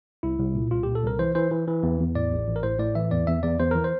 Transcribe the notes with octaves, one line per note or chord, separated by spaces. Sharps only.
C2 E4
C2
A#2
C2 F4
A#2 G4
A4
C2 A#4
E3 C5
E3 C5
E3
E3
E2
E2
A2 D5
A1
A1
A#4
A2 C5
A2 D5
E3 E5
E2 D5
E2 E5
E2 D5
E2 C5
E3 A#4
C5